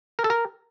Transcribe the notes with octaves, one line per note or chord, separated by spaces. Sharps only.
A#4
A4
A#4